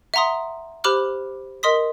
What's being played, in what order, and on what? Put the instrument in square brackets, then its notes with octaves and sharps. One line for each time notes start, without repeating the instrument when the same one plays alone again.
[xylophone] E5 F#5 A#5 C6 D#6
G4 C5 B5 D6 F6 F#6
A#4 D#5 C6 D#6 B6